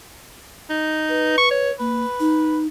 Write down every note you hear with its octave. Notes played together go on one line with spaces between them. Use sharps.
D#4
B4
C#6
C#5
A#3 B4
D#4